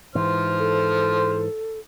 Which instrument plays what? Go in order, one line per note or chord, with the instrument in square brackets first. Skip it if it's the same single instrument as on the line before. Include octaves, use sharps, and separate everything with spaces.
[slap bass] G#2 E3 [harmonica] C5 F6
[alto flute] A4